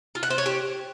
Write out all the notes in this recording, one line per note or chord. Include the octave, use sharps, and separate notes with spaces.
F4
F#5
C5
C#5
G4